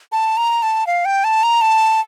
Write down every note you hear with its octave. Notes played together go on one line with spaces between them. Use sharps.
A5
A#5
A5
F5
G5
A5
A#5
A5